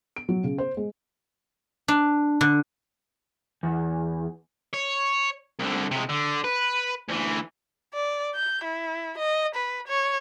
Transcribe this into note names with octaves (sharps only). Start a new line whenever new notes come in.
D7
F#3
C#3
C5
G#3
D4
D3
E2
C#5
C2 D3
C3 G#3
D3
B4
D2 E3
D5
G6
E4
D#5
B4
C#5